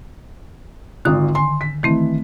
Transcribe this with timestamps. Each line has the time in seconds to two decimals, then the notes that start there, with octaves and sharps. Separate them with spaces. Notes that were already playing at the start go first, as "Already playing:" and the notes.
1.05 G#1 D3 D#3 F4 D#6
1.35 G#5 C6
1.61 B6
1.83 D#3 E3 A3 C4